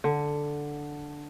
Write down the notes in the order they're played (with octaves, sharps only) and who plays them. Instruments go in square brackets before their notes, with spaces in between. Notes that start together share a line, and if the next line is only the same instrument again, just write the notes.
[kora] D3